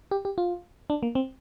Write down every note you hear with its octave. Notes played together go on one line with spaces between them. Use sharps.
G4
G4
F4
D4
A#3
C4